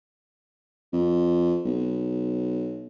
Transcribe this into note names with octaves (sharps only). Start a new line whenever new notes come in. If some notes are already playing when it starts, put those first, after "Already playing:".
F2
B1